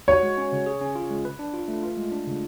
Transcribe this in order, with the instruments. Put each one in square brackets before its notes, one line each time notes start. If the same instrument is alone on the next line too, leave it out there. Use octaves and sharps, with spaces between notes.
[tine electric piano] F#4 [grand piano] C#5
[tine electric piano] G#3
C#4
C#3
G#4
C#4
F4
G#3
B4
D4
F4
A3
F4
G#3
D4
C#3